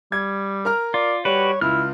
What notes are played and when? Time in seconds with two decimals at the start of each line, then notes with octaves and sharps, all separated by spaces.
0.12 G3 G#6
0.65 A#4 A#5 F6
0.94 F4 D5
1.25 G3 F#4 G4 B4 C#5
1.61 C#2 E4 F6